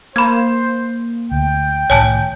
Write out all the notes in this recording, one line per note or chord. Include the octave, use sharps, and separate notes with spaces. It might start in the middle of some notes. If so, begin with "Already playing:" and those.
A#3 C5 B5 G#6
D2 G5
C2 A2 D#3 C#5 G#5 A5